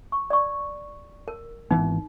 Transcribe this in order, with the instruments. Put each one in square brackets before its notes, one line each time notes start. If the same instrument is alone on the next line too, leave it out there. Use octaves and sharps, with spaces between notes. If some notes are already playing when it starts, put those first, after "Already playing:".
[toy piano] C#6
D5 C#6
A#4
[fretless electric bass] G#1 E3 B3 [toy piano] D#4